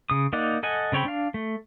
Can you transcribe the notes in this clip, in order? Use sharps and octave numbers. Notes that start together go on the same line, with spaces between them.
C#3 D#6
A#3 D#4 D5 F#5
A4 D#5 F#5 G#5
C#3 C4 C#5 G5 B5
D4 F5
A3